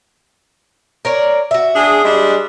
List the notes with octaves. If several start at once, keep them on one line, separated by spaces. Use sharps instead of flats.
A#4 C#5 D5
F#4 E5
D4 G#4
G3 G#3 D4